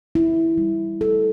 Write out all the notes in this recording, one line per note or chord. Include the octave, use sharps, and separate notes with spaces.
E4
G3
A4